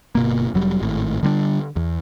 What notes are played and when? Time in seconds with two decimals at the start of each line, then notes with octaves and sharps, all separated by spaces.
0.15 G1 B2 A#3
0.54 F1 F#3 G3
0.82 G#1 A2
1.23 D3 G3 B3 D4
1.76 E2